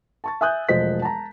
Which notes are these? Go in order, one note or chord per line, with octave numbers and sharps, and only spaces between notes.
A5 C#6 A6
E5 G#5 D#6 F#6 G6
E1 F3 A3 C5 D#5 B6
A5 A#5